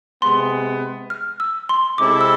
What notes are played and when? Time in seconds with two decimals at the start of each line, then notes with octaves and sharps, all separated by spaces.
0.21 C3 G#3 B3 C6
1.10 F6
1.40 E6
1.69 C6
1.98 C3 G#3 C4 E4 A4 D6
2.21 E6